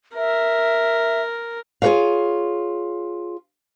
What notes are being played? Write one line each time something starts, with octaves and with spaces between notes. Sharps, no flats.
A#4 E5
F4 G#4 A4 B4 C#5 F5